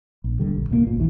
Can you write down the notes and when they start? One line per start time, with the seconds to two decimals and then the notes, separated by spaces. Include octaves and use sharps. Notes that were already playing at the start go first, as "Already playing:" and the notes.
0.24 A#1
0.39 D#1 D3 G3
0.55 A#1
0.69 D#1 C2 C#3 A#3
0.84 F#1 A#2
0.97 A#1 D#2 E3